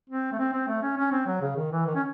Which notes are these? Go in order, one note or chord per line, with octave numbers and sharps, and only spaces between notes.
C4
A3
C4
C4
A3
C#4
C#4
C4
F#3
C#3
D#3
E3
D#3
C#4